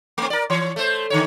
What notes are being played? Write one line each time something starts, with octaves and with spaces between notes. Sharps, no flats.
A3 C4
A#4 D5
E3 C#5
A3 C5
D3 D#3 C#5